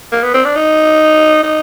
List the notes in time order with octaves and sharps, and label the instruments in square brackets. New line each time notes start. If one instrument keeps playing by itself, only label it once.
[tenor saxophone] A#3
B3
C4
D4
D#4
D#4